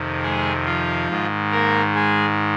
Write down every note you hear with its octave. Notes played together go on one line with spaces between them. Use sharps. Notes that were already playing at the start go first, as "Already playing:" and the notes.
Already playing: F2 C3 D#3
G#3 G#4
F3 F4
G#2 D#3
A#3 A#4
G#3 G#4